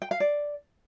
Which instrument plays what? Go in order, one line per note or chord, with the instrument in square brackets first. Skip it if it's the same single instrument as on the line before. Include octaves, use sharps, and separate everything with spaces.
[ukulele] G5
F5
D5